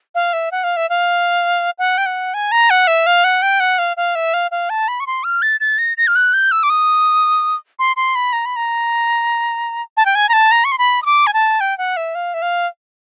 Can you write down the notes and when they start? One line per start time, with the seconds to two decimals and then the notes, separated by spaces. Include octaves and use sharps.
0.15 F5
0.33 E5
0.52 F#5
0.64 F5
0.77 E5
0.90 F5
1.79 F#5
1.98 G5
2.06 F#5
2.34 G#5
2.52 A#5
2.70 F#5
2.87 E5
3.06 F5
3.24 F#5
3.42 G5
3.60 F#5
3.78 F5
3.97 F5
4.15 E5
4.34 F5
4.51 F5
4.70 A5
4.88 B5
5.00 C#6
5.07 C6
5.24 F6
5.42 A6
5.60 A6
5.78 A#6
5.97 A#6
6.07 F6
6.16 F#6
6.34 G6
6.52 E6
6.63 D6
6.70 D#6
7.79 C6
7.96 C6
8.15 B5
8.33 A#5
8.45 B5
8.56 A#5
9.97 A5
10.06 G5
10.15 G#5
10.29 A#5
10.33 A5
10.51 A#5
10.65 C#6
10.72 C6
10.78 B5
11.02 D#6
11.06 D6
11.27 G#5
11.34 A5
11.60 G5
11.78 F#5
11.97 E5
12.15 F5
12.34 E5
12.42 F5